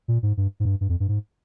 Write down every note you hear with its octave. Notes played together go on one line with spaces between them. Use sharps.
A#2
G#2
G2
G#2
G2
G2
F2
G2
G#2